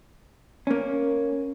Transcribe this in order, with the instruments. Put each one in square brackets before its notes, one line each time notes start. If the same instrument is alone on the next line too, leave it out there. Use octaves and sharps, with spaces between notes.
[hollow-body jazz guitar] A#3 C#4